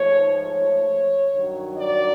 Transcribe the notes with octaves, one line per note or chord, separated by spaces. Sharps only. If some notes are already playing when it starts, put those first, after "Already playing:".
Already playing: G#2 F3 A3 C#5
C#5
G2 D#3 F#3
D5